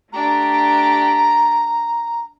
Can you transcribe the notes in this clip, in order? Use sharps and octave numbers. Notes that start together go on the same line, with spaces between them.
A3 D4 G4 A#5